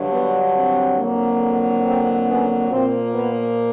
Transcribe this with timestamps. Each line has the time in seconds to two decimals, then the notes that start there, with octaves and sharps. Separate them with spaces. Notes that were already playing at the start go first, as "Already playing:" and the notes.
Already playing: G2 D3 F#3
0.11 B3
0.54 C4
0.98 F2 D3 F#3 A#3
1.84 C4
2.28 B3 C#4
2.71 A#2 F3 A#3 C4
3.14 B3